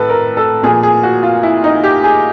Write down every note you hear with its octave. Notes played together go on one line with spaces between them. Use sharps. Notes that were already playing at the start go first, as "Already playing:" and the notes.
Already playing: A2 A4 B4
A#4
A4
A#2 F3 G#4
G#4
F#4
F4
E4
D#4
G4
G#4